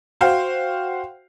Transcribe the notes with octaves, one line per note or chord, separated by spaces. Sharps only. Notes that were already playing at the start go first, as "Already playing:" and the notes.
F#4 C5 F5 G5